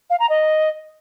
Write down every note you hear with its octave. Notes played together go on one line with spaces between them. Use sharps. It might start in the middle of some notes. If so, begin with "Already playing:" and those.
F5
A#5
D#5